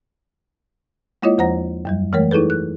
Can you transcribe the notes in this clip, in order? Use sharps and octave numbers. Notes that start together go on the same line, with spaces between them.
G#3 A#3 E4 F4 C#5 D#5
E2 F3 C5 F#5 A#5 A#6
F#2 F#3 G3
E3 G#3 A3 A#4 C#5
D#4 E4 G#4 A4 B4
F#6